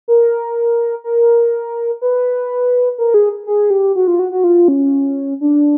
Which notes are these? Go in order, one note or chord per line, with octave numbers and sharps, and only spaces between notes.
A#4
A#4
B4
A#4
G#4
G#4
G4
F#4
F4
F#4
F#4
F4
C#4
D4